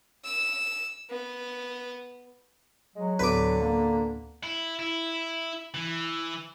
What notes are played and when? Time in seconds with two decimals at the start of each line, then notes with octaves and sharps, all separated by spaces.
0.25 E6
1.10 B3
2.96 F#3 G#3
3.19 D2 A2 D3 B4 D6
3.61 A#3
4.43 E4
4.79 E4
5.74 E3